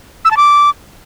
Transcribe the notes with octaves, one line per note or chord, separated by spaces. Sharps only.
E6
A5
D6